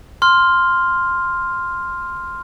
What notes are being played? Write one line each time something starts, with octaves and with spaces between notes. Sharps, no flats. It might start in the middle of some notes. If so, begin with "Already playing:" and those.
C6 F6